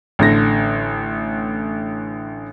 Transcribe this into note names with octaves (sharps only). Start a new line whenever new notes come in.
A1 D3 A#6